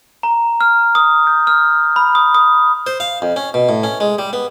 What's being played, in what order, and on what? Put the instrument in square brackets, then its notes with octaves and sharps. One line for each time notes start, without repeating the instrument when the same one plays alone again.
[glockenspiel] A#5
F6
D#6
G6
F6
B5
D#6
D#6
[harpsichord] C5
F5
F2
C#4
B2
A2
C#4
G#3
G3
B3